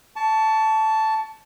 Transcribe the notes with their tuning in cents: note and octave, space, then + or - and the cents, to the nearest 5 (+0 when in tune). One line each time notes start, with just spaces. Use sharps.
A5 +0 C#6 +30